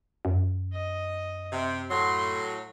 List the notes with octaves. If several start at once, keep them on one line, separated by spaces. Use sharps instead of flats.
F#2
D#5
C3
A2 F#3 C6